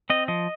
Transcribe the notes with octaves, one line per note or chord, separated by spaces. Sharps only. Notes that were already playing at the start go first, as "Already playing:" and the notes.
C4 D#5
F3 D#5